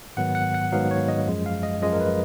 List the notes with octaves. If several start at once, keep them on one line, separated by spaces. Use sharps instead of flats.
G#2 D#3 F#3 B3 F#5
F#5
F#5
G#2 D#3 F#3 B3 F5
C#5
D#5
F#2 F3 G#3
F5
D#5
F#2 F3 G#3 D#5
A#4
B4